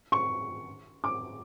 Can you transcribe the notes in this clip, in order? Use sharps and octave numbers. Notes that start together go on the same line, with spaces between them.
C#6
D6